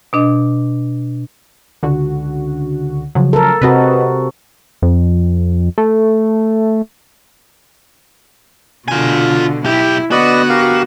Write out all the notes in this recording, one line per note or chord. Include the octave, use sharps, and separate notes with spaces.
B2 D4 D#5
C#2 D3 F#4
C#3 F3 F#3
A4 A#4
C3 C4 F#4 B4 D#5 A5
F2
A3
B2 D3 F4 G#5
B1 E4 G4
D3 B3 F#4 B4 D5 D#5
G4 A#4 F5